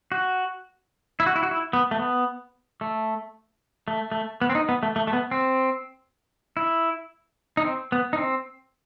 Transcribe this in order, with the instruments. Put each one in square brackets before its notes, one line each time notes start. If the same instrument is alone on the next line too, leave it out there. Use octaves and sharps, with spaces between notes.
[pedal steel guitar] F#4
E4
F#4
E4
F#4
E4
B3
A3
B3
A3
A3
A3
B3
C4
D#4
B3
A3
A3
A3
B3
C4
E4
D#4
C4
B3
D#4
C4